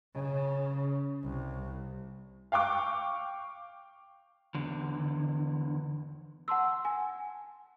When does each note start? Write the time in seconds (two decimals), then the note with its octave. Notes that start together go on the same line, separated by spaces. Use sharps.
0.15 C#3
1.23 C2
2.52 F5 G5 C#6 D6
4.54 E2 D3
6.48 F#5 A5 C6 E6
6.85 G#5